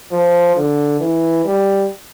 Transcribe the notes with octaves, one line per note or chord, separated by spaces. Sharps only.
F3
D3
E3
G3